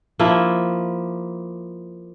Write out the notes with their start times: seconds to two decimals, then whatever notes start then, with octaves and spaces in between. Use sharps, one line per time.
0.19 F3 A#3 E4